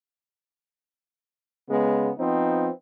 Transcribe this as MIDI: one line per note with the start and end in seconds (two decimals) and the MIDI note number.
1.69 2.09 49
1.69 2.09 56
1.69 2.09 59
2.18 2.68 53
2.18 2.68 59
2.18 2.68 60
2.18 2.68 63